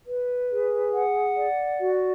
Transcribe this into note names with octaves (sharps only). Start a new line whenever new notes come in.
B4
G#4
F#5
D5
F#4